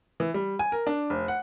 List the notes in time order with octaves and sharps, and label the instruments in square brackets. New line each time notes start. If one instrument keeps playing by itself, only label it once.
[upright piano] E3
G3
G#5
A#4
D4
F1
F#5